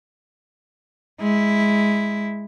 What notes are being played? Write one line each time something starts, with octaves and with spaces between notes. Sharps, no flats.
G#3 E4